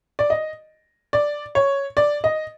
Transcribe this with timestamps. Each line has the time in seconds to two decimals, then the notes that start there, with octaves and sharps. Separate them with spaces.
0.19 D5
0.30 D#5
1.13 D5
1.55 C#5
1.97 D5
2.24 D#5